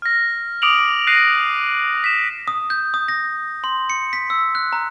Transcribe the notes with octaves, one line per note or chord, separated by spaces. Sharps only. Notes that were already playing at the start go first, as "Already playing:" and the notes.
F6 A#6
D6 D#6 D7 F7 F#7
F#6 A#6 C7 D#7 F7
B6 E7
D#6
G6
D#6
A#6
C6
C#7
B6
E6
F#6
A#5